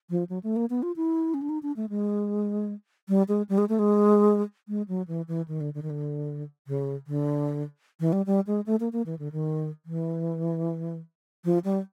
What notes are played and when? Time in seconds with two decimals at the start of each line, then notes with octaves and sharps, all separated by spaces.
0.10 F3
0.30 F#3
0.43 A3
0.56 A#3
0.70 B3
0.83 F4
0.96 E4
1.34 C#4
1.42 D4
1.49 D#4
1.63 D4
1.77 A3
1.89 G#3
3.09 G3
3.28 G#3
3.49 G3
3.58 G#3
3.69 A3
3.79 G#3
4.68 G#3
4.88 F#3
5.08 E3
5.28 E3
5.48 D#3
5.61 D3
5.74 D3
5.82 D#3
5.90 D3
6.67 C#3
7.07 D3
8.00 E3
8.13 G3
8.26 G3
8.47 G#3
8.66 A3
8.80 A#3
8.93 A#3
9.06 E3
9.19 D3
9.32 D#3
9.86 E3
11.45 F3
11.64 G3